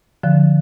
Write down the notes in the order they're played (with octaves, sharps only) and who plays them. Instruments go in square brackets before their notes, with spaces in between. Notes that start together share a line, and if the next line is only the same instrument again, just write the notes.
[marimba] D3 F3